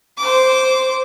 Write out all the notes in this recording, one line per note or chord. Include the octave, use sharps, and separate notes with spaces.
C5 D6